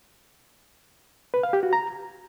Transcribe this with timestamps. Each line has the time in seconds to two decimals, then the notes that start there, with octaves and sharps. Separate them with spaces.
1.34 B4
1.43 F5
1.53 G4
1.63 F#4
1.73 A#5